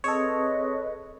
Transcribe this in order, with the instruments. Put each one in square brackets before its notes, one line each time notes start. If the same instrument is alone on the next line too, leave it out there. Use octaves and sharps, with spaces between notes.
[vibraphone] C4 G#4 D#6 [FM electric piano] A4 C#5 [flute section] B4 D#5